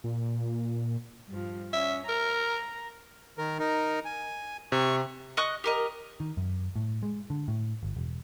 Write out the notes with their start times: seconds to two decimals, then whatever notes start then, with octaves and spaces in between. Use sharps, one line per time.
0.04 A#2
1.30 G2 F3
1.73 C#4 E5
2.09 A#4 A#5
3.38 D#3 A#4
3.59 D#4 A#4
4.05 G#5
4.72 C3 C#6
5.37 D#5 C#6 F#6
5.64 G4 A#4 D#5
6.20 D#3
6.37 F#2
6.76 A2
7.03 G#3
7.30 D3
7.48 A2
7.83 G1
7.97 E1